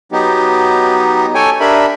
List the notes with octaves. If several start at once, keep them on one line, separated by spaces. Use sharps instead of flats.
F#3 B3 D#4 G4
A4 C#5 G5 G#5
D4 G4 A#4 E5 B5